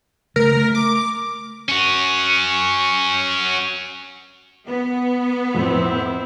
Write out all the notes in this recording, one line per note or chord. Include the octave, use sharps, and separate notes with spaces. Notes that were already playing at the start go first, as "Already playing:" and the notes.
C#3 A3 A#4
A3
D6
C#4 F#4
B3
F2 A2 F3 C4 E4